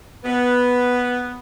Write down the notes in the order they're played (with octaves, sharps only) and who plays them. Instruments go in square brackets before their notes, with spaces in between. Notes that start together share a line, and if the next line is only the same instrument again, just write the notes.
[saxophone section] B3